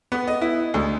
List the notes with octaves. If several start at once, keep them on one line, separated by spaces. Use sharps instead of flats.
B3
D#5
E4
D2